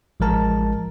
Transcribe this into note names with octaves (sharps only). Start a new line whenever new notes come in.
A1 F3 G#3 A#4 A5